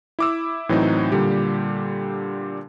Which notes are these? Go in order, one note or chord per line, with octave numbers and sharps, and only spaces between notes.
E4 D6 E6
A2 E3 F#3 C4 D#4
A#2 D3 G3 G4